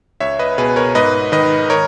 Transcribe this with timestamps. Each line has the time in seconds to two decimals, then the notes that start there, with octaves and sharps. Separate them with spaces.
0.20 C#2 C#5 E5
0.39 B4 D#5
0.58 B2 G#4 B4
0.76 A#4 C#5
0.95 G#2 B4 D#5
1.32 D#3 B4 D#5
1.70 A#4 C#5